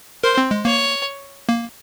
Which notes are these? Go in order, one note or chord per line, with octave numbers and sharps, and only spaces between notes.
A#4 C5
C4
G#3
A#3 C#5
A#3